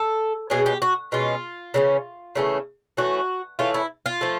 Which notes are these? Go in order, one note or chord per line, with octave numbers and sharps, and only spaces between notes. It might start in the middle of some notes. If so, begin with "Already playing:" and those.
Already playing: A4
B2 G#3 C#4 G#4
G4
F#4
B2 G#3 C#4 F4
C#3 E3 A3 C#4
C#3 E3 A3 C#4
E3 A3 C#4 F#4
E3 A3 C#4 F4
E4
F4
F3 A3